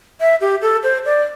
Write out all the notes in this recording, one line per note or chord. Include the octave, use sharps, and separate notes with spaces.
E5
G4
A4
C5
D5